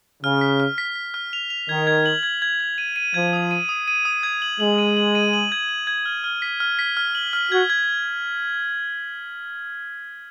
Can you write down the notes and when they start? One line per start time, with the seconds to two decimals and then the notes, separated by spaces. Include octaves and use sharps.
0.23 C#3 F6
0.41 B6
0.60 F6
0.78 B6
0.96 B6
1.14 F6
1.33 F7
1.50 F7
1.69 D#3 G#6
1.87 G#6
2.06 F#7
2.23 G#6
2.42 G#6
2.60 G#6
2.78 D#7
2.96 D#7
3.14 F3 G#6
3.33 D#6
3.51 D#7
3.69 D#6
3.88 D#7
4.05 D#6
4.23 G#6
4.42 F#7
4.60 G#3 F#7
4.78 D#7
4.97 F#7
5.15 D#7
5.33 F#7
5.52 G#6
5.69 F#7
5.87 G#6
6.06 F6
6.24 F6
6.42 B6
6.60 F6
6.79 B6
6.97 F6
7.15 F#7
7.33 F6
7.52 F#4 G#6
7.70 G#6